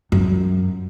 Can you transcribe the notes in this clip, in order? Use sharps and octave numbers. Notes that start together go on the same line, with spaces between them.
F#2